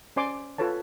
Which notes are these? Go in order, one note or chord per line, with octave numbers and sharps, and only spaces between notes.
C#4 C5 D5 G#5 C6 D6
F4 A4 B4 C#5 A5